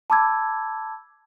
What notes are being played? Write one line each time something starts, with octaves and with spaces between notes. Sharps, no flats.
A5 B5 D6 E6 G#6